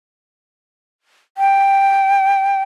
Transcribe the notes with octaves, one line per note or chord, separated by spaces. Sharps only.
G5